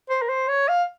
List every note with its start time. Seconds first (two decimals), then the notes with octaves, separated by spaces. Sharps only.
0.10 C5
0.22 A#4
0.29 C5
0.48 C#5
0.68 F5